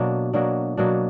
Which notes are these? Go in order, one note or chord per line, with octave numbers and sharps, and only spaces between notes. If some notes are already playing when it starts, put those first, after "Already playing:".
Already playing: B2 F#3 A#3 D4
B2 F#3 A#3 D4
B2 F#3 A#3 D4